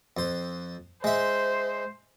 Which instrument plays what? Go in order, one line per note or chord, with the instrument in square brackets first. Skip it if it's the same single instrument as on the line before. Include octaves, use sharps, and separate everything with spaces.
[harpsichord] F2 C5
[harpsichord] G#3 E5 [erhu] C5